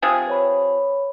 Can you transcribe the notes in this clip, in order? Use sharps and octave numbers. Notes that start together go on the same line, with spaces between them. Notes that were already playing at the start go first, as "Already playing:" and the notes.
C3 F3 G#4
B4 C#5 B5